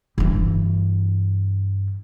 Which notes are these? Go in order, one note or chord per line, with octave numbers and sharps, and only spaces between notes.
G2 E3